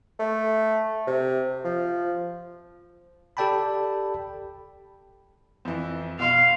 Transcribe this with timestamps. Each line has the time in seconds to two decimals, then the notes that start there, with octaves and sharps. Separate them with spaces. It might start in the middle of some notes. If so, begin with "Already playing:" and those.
0.19 A3
1.07 C3
1.64 F3
3.37 G4 A4 D5 G5 A5 B5
5.65 F2 E3
6.19 B2 F5 C6